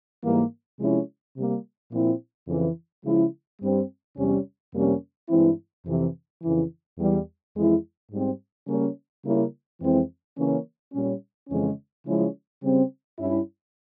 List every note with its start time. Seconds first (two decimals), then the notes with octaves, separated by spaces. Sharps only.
0.23 G#2 E3 G3 A#3
0.78 C3 F3 G#3 C#4 E4
1.35 C3 G3 A#3
1.91 A#2 F3 C4 E4
2.48 F2 C#3 E3
3.04 C#3 F3 G#3 E4
3.60 G2 G3 C4
4.16 E2 C3 G3 C#4
4.73 F2 C3 G3 A#3 C#4
5.29 G2 E3 G#3 C4 E4
5.85 F2 C3 E3
6.42 F2 C#3 E3
6.98 E2 E3 G3
7.55 F2 E3 G#3 E4
8.11 G#2 G3 C4
8.67 C#3 G3 A#3 C#4
9.24 C#3 G3 A#3 C#4 E4
9.80 F2 E3 G#3 C4 E4
10.36 C#3 E3 A#3 C#4
10.93 A#2 G3 C#4
11.49 F2 C#3 E3 G#3 C#4
12.06 C#3 F3 G#3 C#4 E4
12.62 C#3 G3 C4
13.18 G2 G3 C#4 E4